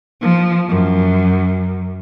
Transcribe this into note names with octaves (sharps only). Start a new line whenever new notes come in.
F3
F#2